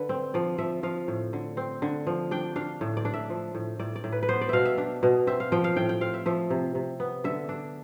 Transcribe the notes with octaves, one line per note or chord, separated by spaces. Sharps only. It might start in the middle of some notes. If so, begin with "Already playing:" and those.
Already playing: D3 B4
C4
F3 D5
F3 E5
F3 F5
A2
D3
C4
D3
F3
D4 G5
D4 F5
A2
D5
D4
E5
F3
A2
A2 D5
D5
A2
B4
B4
B3 C5
D5
B2 E5 F5
E5
D4
B2
C4 E5
F5
F3 G5
F5
A2 G5
G5
C4 F5
E5
F3 E5
C3
C3
B3
D3 E5
D4